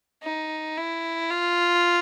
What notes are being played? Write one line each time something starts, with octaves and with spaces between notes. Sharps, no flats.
D#4
E4
F4